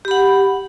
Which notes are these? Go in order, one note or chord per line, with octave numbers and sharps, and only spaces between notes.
G4 F#5 B5